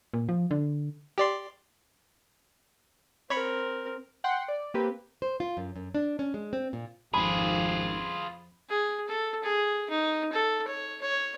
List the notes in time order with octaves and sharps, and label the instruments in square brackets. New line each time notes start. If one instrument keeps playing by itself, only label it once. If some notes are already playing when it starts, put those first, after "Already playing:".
[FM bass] A#2
F3
D3
[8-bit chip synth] G4 D5 C6
[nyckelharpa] C4 A#4 [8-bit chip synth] C#5 B5 C#6
[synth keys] F#5 G5 C6 C#7
D5
A#3 C4 G4 B4
[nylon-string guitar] C5
F4
F#2
F#2
D4
C#4
G#3
C4
A#2
[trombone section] G#1 [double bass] F2 [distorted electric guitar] F4 G#4 [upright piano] B5
[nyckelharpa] G#4
A4
G#4
D#4
A4
C#5
C#5